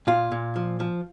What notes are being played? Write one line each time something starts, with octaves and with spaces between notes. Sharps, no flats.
A#2 F4
A#2
F3
F3